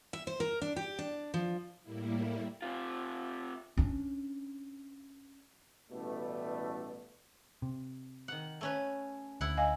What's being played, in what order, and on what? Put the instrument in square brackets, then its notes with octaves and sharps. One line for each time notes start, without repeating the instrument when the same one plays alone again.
[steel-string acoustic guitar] E5
C5
A#4
D4
G4
D4
F3
[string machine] A2 G3 A#3 E4
[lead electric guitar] C3 F4
[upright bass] C#4 D4
[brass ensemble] A1 B2 G3 A3
[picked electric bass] C3
[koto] D#3 F#5
A3 C#4 B4
[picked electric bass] D2 [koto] E4 F#5
[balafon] D#5 F5 G#5